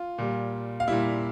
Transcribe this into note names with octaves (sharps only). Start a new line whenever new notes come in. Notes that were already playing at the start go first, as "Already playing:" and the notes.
Already playing: F4
A#2 G3
F5
A#2 G3 E4 E5